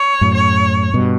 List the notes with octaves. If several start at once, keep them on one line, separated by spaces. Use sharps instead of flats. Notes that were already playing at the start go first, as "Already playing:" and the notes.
Already playing: C#5
F#2 A2
C#5
G2 B2